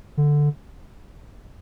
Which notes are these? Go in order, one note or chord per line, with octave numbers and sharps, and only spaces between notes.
D3